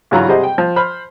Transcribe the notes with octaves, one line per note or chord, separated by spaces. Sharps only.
G2 C#3 E3 F#3 F4 A#5
C3 G3 G#4 C5 D#5 F#5
G5
F3
C5 B5 F6